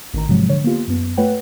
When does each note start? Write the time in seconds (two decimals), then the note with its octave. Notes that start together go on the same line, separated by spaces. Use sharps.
0.14 A1 D#3 A#5
0.28 G#2 C3 F3 F#3 G#3
0.48 D3 C#5
0.64 A#3 B3 F4 G4
0.88 F#2 B3
1.17 A3 F4 B4 C#5 F#5 G5